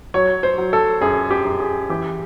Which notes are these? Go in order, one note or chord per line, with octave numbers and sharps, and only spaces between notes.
F#3 C#5
C5
F#3
A4
F#2 G#4
G4
F#2
G#4
E3 G4